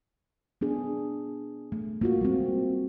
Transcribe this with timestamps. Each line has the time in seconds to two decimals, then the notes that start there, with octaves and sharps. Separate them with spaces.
0.61 B3 D4 G#4
1.72 A3
2.01 A#3 F4 F#4
2.21 G3 G#3 C4